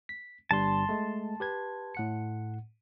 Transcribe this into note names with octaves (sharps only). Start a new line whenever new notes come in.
B6
G1 G2 G3 A5 C6
G#3 A3
G4 B4 G#6
A2 F#5 C#7